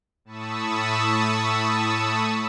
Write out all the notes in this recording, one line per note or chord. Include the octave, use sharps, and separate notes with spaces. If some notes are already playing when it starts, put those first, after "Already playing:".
A2 A5 B5 C#6 D#6 E6